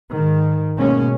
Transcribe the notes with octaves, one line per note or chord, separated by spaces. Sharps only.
G#2 D#3
B2 G#3 A#3 C#4